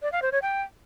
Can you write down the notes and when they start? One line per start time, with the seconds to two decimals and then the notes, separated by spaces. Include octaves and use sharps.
0.02 D5
0.12 F5
0.22 C5
0.32 C#5
0.42 G5